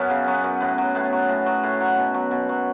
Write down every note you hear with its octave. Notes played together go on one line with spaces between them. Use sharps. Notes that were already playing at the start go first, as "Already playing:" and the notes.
Already playing: F#2 F#3 B3 C#4
C#3
F#3 B3
F#2
A2 B3
F#3
A2 B3
F#3
A2
F#3
A2
F#3
B2
F#3
B2
F#3